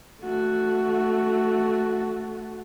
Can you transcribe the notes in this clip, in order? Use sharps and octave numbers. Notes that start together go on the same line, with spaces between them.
A3 F#4